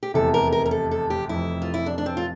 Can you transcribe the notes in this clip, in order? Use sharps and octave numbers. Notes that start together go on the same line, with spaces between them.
G4
F1 E2 C3 A4
A#4
A#4
A#4
A4
A4
G4
F1 F2 E3 E4
F4
E4
D4
D4
C4
F4